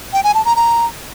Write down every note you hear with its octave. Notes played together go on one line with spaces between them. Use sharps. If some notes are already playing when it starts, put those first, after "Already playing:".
G5
G#5
A5
A#5
A#5